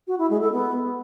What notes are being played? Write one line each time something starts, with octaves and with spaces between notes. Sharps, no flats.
F#4
E4
G#3
A4
B3